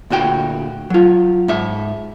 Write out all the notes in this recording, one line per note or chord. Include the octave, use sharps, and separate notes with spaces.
D2 A#2 F#4 G5
F#3 F4
G#2 E5